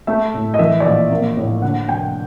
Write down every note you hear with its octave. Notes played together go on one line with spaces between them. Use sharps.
A3 E5
A2
D#5
E3 E5
D5
A#1 D#5
A#3
A2
D3 F#5
F1 G5